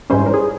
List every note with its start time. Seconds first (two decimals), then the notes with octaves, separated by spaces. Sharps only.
0.10 G#2 E3 G3 C#4 C5
0.26 A#4
0.34 G#4